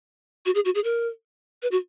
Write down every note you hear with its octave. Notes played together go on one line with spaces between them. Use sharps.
F#4
G#4
F#4
G#4
A#4
B4
F#4